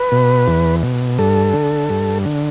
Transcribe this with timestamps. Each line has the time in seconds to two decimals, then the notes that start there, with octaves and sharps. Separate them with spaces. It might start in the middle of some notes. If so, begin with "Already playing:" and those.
Already playing: B4
0.12 B2
0.48 E2
0.83 B2
1.19 G2 A4
1.53 D3
1.90 G2
2.25 D3